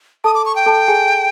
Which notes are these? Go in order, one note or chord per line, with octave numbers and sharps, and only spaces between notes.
A4 A5 D#6
D6
C#6
G5
A4 A5
G#4 G#5